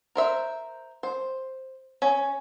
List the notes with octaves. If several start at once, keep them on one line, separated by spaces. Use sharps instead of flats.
A#4 C5 E5
C5
C#4